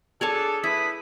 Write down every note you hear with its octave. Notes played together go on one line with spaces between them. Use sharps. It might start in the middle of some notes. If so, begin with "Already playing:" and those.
D4 G#4 A4 C#5 A5
A3 E4 B4 D#6 B6